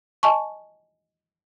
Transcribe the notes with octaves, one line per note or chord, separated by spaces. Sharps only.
D#5 G#5 A5 C#6